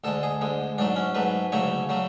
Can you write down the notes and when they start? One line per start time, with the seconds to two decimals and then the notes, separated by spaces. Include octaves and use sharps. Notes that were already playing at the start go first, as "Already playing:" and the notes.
0.04 D2 D3 G#3 A4
0.23 G#4
0.41 D2 D3 G#3
0.78 G#2 F#3 A3 D4
0.96 C#4
1.15 G#2 F#3 A3 B4
1.52 D2 C#3 F#3 A3 C#5
1.89 C#3 F#3 A3